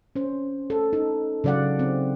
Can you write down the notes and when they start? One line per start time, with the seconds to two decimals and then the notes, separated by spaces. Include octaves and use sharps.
0.16 C#4 C5
0.70 A4
0.93 D#4
1.44 C#3 F#3 D5 F5 F#5
1.79 C4 D#4